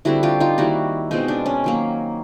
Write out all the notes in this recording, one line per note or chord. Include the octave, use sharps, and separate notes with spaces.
D3 G3 C4 E4 F#4
F4 G4
D#4 F4
D#3 G3 A#3 E4 F#4
B2 G#3 C4 D#4 F4
D4
C#4
D#3 F#3 A#3